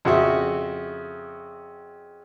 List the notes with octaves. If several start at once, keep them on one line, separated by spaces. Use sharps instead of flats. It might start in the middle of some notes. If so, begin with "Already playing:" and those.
F2 C#3 F#4 E5